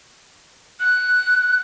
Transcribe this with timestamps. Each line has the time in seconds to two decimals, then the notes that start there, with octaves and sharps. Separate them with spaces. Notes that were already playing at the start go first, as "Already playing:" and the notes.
0.80 F#6